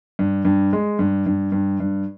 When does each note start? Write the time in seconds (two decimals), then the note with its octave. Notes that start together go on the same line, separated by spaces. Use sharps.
0.19 G2
0.45 G2
0.73 G#3
0.99 G2
1.26 G2
1.52 G2
1.80 G2